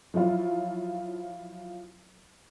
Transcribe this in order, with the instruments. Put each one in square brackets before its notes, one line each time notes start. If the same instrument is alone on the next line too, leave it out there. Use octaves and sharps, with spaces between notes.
[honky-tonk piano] F3 F#3 E4 F4